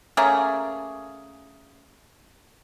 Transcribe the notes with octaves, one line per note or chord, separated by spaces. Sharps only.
A3 A#3 C#4 G#4